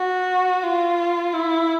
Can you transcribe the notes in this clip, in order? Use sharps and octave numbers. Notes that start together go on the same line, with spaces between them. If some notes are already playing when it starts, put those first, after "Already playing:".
Already playing: F#4
F4
E4